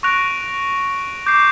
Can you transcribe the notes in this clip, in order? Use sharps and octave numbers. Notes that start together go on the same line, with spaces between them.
C#6 F#6 A#6 D7 F7
D6 G6 C7